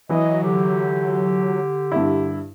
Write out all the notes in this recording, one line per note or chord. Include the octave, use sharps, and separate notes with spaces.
E3 F#3 E4 D#5
D3 G4
G2 E4